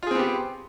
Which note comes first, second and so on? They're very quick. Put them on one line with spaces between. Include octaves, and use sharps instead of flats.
F4 G#4 C4 B3 G4